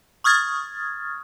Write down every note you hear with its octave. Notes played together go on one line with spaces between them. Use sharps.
C#6 D#6 F6 G#6 A6